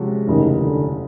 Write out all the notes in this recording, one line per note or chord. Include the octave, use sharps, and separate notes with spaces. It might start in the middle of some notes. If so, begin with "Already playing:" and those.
Already playing: C3 F3 G#3 C#4 F#4
F#1 E2 C3 D#3 F3 A3
D3